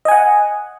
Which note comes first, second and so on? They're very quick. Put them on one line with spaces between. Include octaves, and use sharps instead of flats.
D#5 G#5 F#5